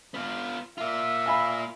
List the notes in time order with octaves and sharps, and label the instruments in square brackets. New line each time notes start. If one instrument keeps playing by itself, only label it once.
[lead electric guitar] B3 F4
[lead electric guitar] A#3 F4 [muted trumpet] E5
[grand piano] F5 G#5 B5